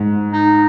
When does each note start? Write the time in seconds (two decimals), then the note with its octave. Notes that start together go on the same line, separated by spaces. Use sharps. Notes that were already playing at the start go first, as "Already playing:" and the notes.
Already playing: G#2
0.33 D#4